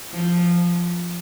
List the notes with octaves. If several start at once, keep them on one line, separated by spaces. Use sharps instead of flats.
F3